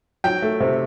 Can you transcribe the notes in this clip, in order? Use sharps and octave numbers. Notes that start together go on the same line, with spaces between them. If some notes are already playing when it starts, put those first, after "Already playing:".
F#3 G5
A3
C3